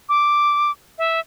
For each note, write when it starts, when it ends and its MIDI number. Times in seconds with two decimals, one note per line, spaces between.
0.09 0.71 86
0.98 1.20 76